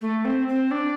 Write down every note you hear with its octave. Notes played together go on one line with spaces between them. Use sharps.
A3
C4
C4
D4